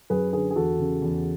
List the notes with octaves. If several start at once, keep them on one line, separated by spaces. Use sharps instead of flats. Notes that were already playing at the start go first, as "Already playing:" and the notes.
F#2 G#4 B4
D3 G#4 B4
G#4
E2 F#4 A4
C#3
E2